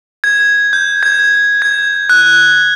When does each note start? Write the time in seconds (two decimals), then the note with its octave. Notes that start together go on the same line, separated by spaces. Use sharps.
0.24 G#6
0.73 G6
1.03 G#6
1.62 G#6
2.10 F#6